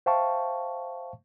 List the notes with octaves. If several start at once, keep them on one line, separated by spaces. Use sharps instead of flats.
C5 E5 F5 G5 A5 C#6